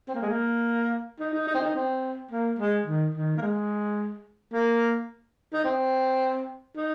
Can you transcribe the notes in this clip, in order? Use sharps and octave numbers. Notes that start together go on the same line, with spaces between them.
C4
A#3
G#3
A#3
D#4
D#4
D#4
C4
D#4
C4
A#3
G#3
D#3
D#3
A#3
G#3
A#3
D#4
C4
D#4